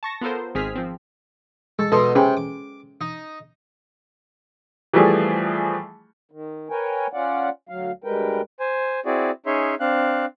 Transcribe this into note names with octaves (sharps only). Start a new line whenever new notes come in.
A5 C#6 A#6
B3 F4 A4 A#4 C5
G#1 D#3 C4 G#4 F6 B6
F3 C4
G#3 A4
B2 D#4 A4 C6
C3 C#4 G#4 B4 G5
D6
D#4
E3 F3 G3 A3 G#4
D#3
A#4 B4 C#5 G5 G#5
C#4 F4 D5 F#5
D2 F#3 F5
D2 G3 G#3 A#4 B4 G5
C5 G#5
C4 E4 F#4 G#4 D5
C#4 D#4 G#4 C#5 E5 C6
C4 D4 F5 F#6